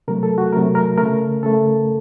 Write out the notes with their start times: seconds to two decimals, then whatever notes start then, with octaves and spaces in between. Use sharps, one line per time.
0.08 C3 F#3 A3 A#4
0.23 A4
0.38 F#4
0.53 C3 F#3 A3 A#4
0.75 A#4
0.98 C#3 A3 A#4
1.43 C#3 A3 A4